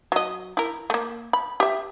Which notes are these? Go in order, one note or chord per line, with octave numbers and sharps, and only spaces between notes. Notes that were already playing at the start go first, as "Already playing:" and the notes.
F#3 D#5
E4 A#4
A3 A#3
B5
G4 E5